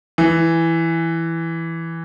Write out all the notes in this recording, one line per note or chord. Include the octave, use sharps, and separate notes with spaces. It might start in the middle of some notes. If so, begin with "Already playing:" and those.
E3